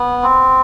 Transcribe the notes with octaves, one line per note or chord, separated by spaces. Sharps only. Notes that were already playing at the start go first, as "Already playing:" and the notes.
Already playing: B3
C4